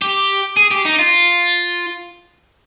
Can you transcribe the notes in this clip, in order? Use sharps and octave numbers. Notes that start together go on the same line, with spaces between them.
G4
G#4
G4
D#4
F4